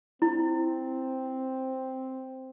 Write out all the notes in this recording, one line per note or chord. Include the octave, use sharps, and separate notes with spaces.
C4 E4